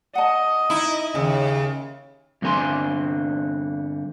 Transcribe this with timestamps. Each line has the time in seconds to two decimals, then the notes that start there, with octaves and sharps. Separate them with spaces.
0.15 D#5 F#5 A5
0.70 D#4 E4
1.15 D#2 C#3
2.42 G2 D3 C4 A#4 G#5 C6